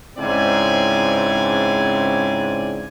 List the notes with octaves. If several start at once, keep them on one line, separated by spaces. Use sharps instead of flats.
G#2 C#3 C4 E4 D5 G#5